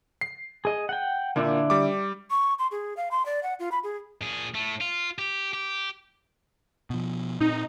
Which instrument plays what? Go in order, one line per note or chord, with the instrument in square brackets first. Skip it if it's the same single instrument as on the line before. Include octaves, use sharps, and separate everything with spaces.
[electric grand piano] C7
[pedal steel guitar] G#4 D#5
F#5 G5
[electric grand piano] A#2 A#3 [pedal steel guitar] D3 D4 E4
[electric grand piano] G3 D6
[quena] C#6
C6
G#4
F5
C6
D5
F#5
F4
B5
G#4
[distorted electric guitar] A#2 G#4
A2 A3
F4
G4
G4
[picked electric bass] B2 F3
[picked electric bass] A#2 C4 [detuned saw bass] D#4